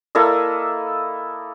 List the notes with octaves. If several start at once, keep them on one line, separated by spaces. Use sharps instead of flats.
A#3 E4 A4 D#5